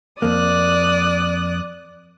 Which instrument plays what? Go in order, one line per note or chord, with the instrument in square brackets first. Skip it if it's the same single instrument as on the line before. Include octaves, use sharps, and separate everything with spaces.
[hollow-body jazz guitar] F2 A#3 [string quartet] D5 D#6 F#6